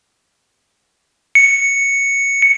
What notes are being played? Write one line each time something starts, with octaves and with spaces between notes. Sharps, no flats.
C#7